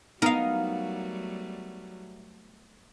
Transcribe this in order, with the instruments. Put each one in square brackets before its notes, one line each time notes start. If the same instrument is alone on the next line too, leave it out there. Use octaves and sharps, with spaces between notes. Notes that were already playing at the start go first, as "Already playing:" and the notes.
[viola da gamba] F#3 G3 A3 [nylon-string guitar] B3 [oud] D#4 [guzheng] A#4 F5